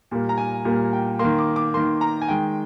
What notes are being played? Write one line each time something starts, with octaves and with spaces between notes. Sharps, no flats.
A#2 G3 A#3
A#5
G#5
A#2 G3 A#3
G5
A#3 C6
D#3
D6
D6
D#3 A#3 C6
A#5
G#5
D#3 G#3 G5